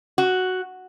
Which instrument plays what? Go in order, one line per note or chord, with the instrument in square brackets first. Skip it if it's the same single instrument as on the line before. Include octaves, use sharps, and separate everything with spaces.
[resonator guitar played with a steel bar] F#4